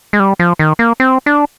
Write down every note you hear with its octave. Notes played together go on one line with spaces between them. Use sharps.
G#3
G3
F3
D#3
A#3
C4
D4